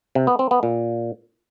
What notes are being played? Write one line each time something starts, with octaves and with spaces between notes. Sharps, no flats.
C3
B3
C4
B3
A#2